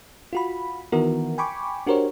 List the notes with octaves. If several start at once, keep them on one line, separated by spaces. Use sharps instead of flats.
F4 F#4 B5
D#3 E3 B3 E4 F#4 A#4
G5 G#5 B5 C#6 D6
D4 F#4 G4 A#4 C5 C#5